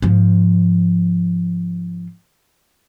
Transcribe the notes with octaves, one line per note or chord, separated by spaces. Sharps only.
G#2 F3